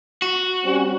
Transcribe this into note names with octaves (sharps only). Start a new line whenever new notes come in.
F#4
G3 C4 C#4